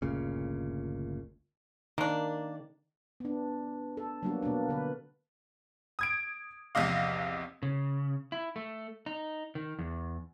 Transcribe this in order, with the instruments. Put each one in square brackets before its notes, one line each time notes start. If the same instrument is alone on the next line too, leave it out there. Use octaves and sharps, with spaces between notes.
[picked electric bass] G1 D2 A#2 C#3
[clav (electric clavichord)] D#3 [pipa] A#3 D4
[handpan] B3 D4
A4
F#3 G3 A#3 B3 D4 F#4
B2 A#3 B3 D4
D3 B4
[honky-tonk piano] D#6 G#6 D7
A#1 E2 C3 D#5 F5
[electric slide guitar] C#3
E4
A3
D#4
D#3
E2